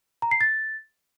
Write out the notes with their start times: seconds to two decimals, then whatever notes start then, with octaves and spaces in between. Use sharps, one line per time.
0.22 A#5
0.31 C7
0.41 A6